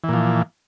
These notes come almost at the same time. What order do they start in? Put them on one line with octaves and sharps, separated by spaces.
E3 A#2 F3